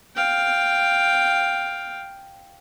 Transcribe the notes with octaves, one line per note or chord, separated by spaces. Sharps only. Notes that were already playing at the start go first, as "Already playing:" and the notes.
F5 G5